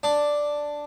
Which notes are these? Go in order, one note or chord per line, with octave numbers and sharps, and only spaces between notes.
D4